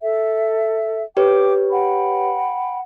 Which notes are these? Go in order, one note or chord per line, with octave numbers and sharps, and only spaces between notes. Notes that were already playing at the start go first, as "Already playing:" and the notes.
A4 E5
G4 B4 C#5 G5 D6
F#5 G5 B5